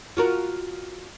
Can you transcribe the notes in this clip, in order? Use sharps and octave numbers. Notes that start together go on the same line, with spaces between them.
F4 F#4 A#4